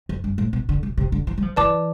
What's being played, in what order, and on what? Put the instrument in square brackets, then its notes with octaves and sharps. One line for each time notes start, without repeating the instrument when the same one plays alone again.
[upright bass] F2
G2
A2
B2
D3
C3
C3
D3
E3
G3
F3
[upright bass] E3 [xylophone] B4 D5 A5 D6